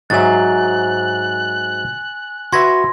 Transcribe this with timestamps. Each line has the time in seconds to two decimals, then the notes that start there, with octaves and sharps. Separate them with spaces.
0.10 G#2 F#3 E5 G#5 F#6 A6
2.52 F#4 B4 E5 C6 G#6 A#6